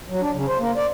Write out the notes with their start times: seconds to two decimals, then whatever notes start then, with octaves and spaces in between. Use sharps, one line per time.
0.08 F#3
0.21 D4
0.34 C#3
0.47 C5
0.59 A#3
0.76 D5